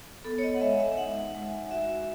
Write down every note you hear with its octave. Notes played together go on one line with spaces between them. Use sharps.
B3 A4
C#5
D#5
F#5
G#3 E5
E5
D#4 F#5
G#3
F#4 E5